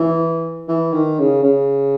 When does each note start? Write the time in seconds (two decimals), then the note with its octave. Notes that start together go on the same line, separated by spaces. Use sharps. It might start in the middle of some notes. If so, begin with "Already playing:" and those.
Already playing: E3
0.68 E3
0.93 D#3
1.19 C#3
1.43 C#3